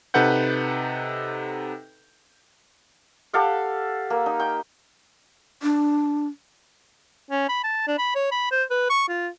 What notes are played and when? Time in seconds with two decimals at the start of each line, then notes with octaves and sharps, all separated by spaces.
0.14 C3 D#4 A4 B4 F#5 G6
3.33 G4 A4 F5 F#5
4.10 A#3
4.26 D#4
4.40 G5
5.63 D4
7.31 C#4
7.49 B5
7.64 A5
7.87 D4
7.98 B5
8.15 C#5
8.32 B5
8.52 C5
8.71 B4
8.90 C#6
9.08 F4